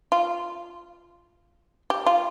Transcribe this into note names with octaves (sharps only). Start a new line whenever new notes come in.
F4
G4
F4